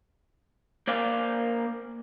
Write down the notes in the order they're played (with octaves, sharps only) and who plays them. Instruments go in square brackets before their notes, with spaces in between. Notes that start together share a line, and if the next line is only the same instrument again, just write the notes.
[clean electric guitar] A#3 C5 D5 F5